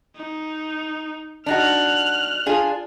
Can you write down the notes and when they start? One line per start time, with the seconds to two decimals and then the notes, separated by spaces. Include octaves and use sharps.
0.16 D#4
1.46 D4 D#4 F#4 F6 F#6
2.46 D4 F4 G#4